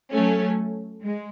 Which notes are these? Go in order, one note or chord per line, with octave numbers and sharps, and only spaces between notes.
F#3 A3 C#4
G#3